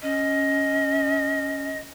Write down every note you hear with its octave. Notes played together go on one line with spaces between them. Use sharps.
C#4 D#5